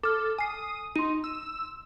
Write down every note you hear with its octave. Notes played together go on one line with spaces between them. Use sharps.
A4 D6 F6
G#5 D#6 C7
D#4 C6 D#7
E6